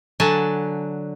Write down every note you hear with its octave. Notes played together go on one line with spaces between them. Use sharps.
D3 F#3 G#5 A5